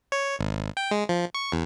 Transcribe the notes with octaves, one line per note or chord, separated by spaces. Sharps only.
C#5
G#1
G5
G#3
F3
C#6
E2